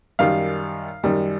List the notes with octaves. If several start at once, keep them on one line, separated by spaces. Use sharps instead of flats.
F#2 D#3 G3 F5
F#2 D#3 G3